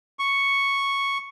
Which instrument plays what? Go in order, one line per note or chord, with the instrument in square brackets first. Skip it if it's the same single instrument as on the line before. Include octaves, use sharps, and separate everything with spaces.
[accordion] C#6